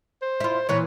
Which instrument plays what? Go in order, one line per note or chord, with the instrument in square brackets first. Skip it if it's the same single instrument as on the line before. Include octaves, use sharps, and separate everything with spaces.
[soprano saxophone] C5
[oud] E4 F4
[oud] A#2 E3 [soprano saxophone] C#5